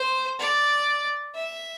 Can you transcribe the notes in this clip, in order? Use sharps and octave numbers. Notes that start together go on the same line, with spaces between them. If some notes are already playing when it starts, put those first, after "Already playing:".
Already playing: C5
D5
E5